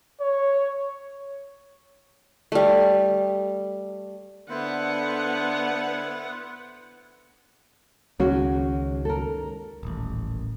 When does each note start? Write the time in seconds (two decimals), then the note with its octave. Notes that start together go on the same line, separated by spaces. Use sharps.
0.20 C#5
2.52 G3 A3
4.50 D3 B3 E4 C5 F#5
8.20 C#2 D#3 G#3 C#4 F#4
9.05 A4 A#4
9.83 D#1 A1